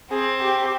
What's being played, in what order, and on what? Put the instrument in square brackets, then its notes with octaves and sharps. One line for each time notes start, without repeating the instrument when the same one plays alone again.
[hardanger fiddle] C4 [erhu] G#4
[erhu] G4